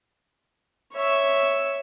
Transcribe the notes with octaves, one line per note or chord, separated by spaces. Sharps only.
C#5 E5